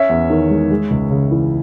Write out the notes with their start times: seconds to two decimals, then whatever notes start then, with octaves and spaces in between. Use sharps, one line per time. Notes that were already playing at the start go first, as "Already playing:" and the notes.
Already playing: C#4 C#5 E5
0.09 E2
0.30 D#3
0.50 G#3
0.71 G#3
0.90 C#2
1.11 C#3
1.31 E3